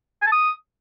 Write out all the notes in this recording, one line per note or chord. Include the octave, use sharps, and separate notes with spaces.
G#5
A5
D#6